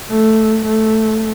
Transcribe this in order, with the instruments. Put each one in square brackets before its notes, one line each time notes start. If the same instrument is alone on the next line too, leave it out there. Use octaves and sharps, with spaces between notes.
[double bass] A3
A3